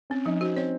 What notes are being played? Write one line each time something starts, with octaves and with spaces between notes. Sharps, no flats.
C4 C#4
F3 D#4
C4 F#4
C4 C#5